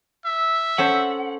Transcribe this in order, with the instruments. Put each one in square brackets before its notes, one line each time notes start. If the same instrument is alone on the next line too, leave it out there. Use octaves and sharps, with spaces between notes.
[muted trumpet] E5
[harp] C#4 A4 C5 [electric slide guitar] F#5